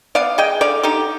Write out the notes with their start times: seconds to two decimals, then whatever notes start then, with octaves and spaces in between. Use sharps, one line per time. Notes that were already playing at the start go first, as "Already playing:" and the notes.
0.15 B3 D5 F5
0.38 G#3 D#5 G5
0.61 D3 D5 F5
0.83 D3 D#4 G4